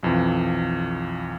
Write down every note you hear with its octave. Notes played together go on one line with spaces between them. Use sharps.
B1 F2 E3